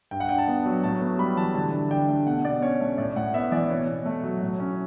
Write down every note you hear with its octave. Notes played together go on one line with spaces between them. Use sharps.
G2 G5
F#5
D4 G5
A5
B3
F#3
A2 A5
B3
G3 B5
E3 A5
D3 A5
D3
D4 G5
A3
B2 F#5
B2 D5
C#4 C#5
A3
A2 D5
A2 F#5
B3 E5
E3 D5
B2 C#5
B2
A3
F#3
A2
C#4